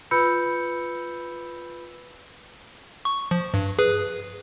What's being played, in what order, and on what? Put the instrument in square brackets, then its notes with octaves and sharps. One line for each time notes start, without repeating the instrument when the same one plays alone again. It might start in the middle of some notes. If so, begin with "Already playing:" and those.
[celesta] F4 B4 B5 E6 G6 C#7
[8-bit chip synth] C#6
F3
G2
G#4 B4